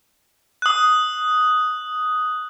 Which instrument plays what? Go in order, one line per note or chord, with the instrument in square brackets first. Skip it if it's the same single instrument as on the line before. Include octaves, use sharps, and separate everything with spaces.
[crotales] D#6 F#6